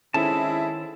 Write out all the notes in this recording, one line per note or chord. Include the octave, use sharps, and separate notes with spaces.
D#3 G#3 C4 C#4 E4 A4 A5